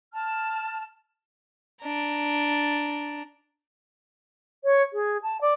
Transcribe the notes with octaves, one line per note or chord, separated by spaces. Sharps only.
A5 F6
D4 A#5
C#5
G#4
A5
D5